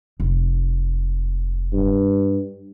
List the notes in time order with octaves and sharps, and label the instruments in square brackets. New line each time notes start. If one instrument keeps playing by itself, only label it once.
[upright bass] F1
[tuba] G2